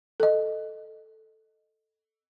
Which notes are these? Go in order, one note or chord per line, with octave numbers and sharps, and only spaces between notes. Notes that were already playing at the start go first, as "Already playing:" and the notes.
A4 D#5